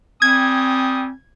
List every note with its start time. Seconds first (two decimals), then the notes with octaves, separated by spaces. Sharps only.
0.22 G3 C4 G#5 D#6 G#6